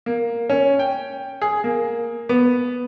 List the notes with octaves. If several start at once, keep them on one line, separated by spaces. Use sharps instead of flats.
A#3
C#4
G5
G#4
A#3
B3